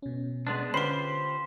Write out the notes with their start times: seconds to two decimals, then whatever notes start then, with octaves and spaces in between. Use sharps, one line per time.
0.02 B2 C#4
0.47 G#3 B3 D4
0.74 D3 C#4 F4 G4 B4 C5 B5 C6